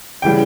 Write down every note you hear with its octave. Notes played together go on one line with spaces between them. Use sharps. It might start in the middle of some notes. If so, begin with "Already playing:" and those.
C#3 E3 G3 G5